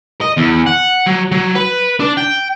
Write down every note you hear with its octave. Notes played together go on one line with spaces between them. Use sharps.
D#5
E2
F#5
F#3
F#3
B4
D4
G5